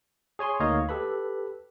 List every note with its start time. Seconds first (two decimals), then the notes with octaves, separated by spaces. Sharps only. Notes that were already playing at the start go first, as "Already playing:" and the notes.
0.39 G#4 C#5 G#5 C6
0.60 D2 A#3 D#4 C#5 D#5 F5
0.89 G4 A4 B4 B5